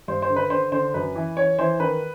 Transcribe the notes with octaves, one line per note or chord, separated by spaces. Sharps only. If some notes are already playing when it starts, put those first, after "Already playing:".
G2 C5
C5
D3
B4
D3 C5
D3 C5
F#2 B4
E3
E3 C#5
E3 C5
D#3 B4